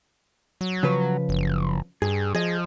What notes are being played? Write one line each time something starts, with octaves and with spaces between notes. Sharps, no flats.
F#3
C#3 F3 B4
F#1
G2 G#4
F3 G#4 D#5